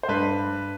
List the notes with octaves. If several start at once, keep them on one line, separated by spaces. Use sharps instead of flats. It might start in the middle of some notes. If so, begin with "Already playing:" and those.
C5
G2 B4